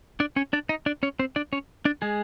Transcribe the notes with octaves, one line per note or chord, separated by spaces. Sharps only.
D4 D5
C#4 C#5
D4 D5
D#4 D#5
D4 D5
C#4 C#5
C4 C5
D4 D5
C#4 C#5
D4 D5
G#3 G#4